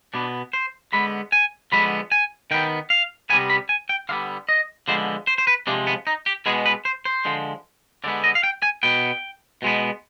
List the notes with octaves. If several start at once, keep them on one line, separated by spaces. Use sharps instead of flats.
B2 B3 D4
C5
D3 G#3 B3 B5
G#5
D3 F3 G#3 B3 B5
G#5
D#3 B3 G5
F5
C3 G3 B3 G#5
B5
G#5
G5
D3 G3 B3 F5
D#5
D3 F3 G#3 B3 C5
C5
C5
B4
C3 F3 G#3 D4
B3
D#4
G4
B2 G#3 B3 G#4
B4
C5
C5
D3 F3 G#3
D3 G#3 B3 D5
D#5
F5
G5
G#5
B2 B3 G5
B2 G#3 B3